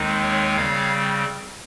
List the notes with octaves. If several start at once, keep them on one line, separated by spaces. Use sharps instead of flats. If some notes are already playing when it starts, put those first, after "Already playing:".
Already playing: D#2 D#3 G#3 C4 D#4
A#4 C#5
C#3 G3 C4 C#5 F5